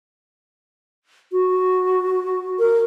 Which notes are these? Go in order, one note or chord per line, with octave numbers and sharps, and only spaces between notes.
F#4
A#4